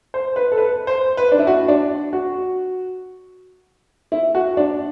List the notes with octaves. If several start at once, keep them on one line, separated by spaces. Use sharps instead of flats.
C5
B4
A4
B4
C5
B4
D4
E4
F#4
D4
F#4
E4
F#4
D4